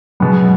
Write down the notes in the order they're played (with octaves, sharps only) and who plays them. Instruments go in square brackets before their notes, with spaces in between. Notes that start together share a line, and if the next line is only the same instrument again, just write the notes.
[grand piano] B2 G#3 B3 [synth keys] F#3